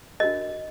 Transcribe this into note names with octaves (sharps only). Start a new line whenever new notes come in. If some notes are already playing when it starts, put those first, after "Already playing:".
D4 F#4 A#4 D#5